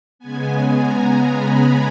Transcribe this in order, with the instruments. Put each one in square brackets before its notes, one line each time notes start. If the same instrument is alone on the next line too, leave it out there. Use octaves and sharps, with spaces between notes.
[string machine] C#3 G#3 B3 G#5
A#5
B5